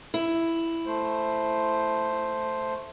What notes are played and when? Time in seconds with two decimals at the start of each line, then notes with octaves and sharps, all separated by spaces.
0.14 E4
0.86 A3 C5